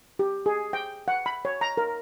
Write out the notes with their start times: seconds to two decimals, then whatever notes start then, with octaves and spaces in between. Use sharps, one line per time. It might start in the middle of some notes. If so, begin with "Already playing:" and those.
0.19 G4
0.46 G#4
0.73 G5
1.08 F#5
1.26 B5
1.45 C#5
1.61 A#5
1.77 A#4